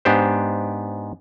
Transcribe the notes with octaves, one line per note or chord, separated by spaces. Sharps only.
G#2 B3 D4 G4 C5